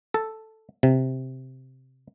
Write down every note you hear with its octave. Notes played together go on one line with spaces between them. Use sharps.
A4
C3